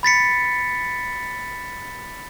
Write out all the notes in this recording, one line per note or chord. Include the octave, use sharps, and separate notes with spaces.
B5 A6 B6 C#7